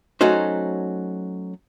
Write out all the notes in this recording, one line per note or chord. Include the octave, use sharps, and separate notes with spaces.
F#3 A3 C#4 D#4 F#4 C5